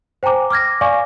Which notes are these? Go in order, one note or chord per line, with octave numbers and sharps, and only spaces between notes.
C5 G5 G#5 A#5 D6
D6 F6 G#6 A#6
D5 F5 G#5 C#6 D6